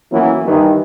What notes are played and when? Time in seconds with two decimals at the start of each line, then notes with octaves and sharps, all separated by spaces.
0.12 E3 F#3 A#3 B3 C#4 E4
0.46 G2 D#3 E3